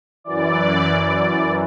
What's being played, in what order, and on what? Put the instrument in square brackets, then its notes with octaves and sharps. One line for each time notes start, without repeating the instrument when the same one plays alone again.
[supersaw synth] F#2 E3 D5